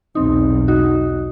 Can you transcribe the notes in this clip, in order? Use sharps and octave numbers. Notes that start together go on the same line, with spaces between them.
B1 E2 C4 D#4
D#4 F#4